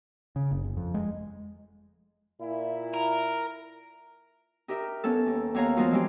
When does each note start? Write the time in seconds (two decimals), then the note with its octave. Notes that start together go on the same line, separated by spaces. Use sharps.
0.36 C#3
0.51 F#1
0.64 F#1
0.77 F2
0.94 G#3
2.41 A#2 E4
2.94 A#4
4.68 D#4 G4 A#4 E5
5.04 B3 C#4 A4
5.26 D#2
5.54 D#2 B3 C#5 F5 A#5
5.76 F3 G#3 B3 D#4 F4 F#4
5.91 E3 G#3 C4 C#4 G4